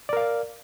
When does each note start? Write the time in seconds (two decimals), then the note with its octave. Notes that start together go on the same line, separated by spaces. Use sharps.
0.09 D5
0.13 A#4
0.17 F5